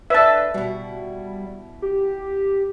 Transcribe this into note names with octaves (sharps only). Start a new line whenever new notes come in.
D4 G4 A4 B4 E5 A5
B2 G3 E4
G4